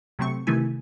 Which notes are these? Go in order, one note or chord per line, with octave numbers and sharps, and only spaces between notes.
C3 F#3 A3 C4 C#6
C3 D#3 E3 A3 E4 G#5